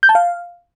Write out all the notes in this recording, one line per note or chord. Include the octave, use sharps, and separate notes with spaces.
G6
A5
F5